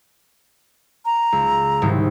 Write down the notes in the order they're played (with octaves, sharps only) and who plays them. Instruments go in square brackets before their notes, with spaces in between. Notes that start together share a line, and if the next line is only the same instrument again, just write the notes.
[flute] A#5
[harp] C#2
C2 G#2 D#3